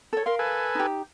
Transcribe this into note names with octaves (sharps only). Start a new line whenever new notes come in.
A4 C#5
A#4 F5 C6
A4 B4 G#5
D#4 G4